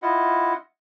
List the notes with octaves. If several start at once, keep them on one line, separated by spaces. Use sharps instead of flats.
E4 F4 D#5 F#5